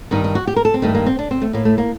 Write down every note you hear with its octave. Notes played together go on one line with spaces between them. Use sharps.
G2 D#3 D#4
D#4
F#4
G4
A#4
A4
C4
G2 D#3 A3
A#3
C4
D4
C4
A3
A2 A#3
A3
A#3